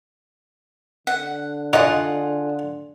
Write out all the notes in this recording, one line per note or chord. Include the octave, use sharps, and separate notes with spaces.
D3 F#5
D#4 F4 G#4 D5 D#5 F#5